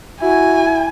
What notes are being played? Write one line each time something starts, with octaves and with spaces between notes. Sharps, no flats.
E4 F#4 G#5